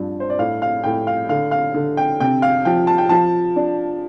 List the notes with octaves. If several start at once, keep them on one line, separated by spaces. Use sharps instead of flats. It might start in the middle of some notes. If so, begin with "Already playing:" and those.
Already playing: G2 F3
C5
D5
A2 F5
F5
A2 G5
F5
D3 F5
F5
D3
G5
C3 G5
F5
F3 G5
A5
G5
F3 A5
D4